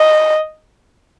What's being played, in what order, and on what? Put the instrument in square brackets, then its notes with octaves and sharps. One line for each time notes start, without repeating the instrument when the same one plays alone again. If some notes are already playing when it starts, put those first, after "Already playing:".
Already playing: [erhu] D#5